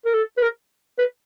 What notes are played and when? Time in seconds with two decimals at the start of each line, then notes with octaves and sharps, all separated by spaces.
0.06 A#4
0.14 A4
0.38 B4
0.42 A#4
0.99 B4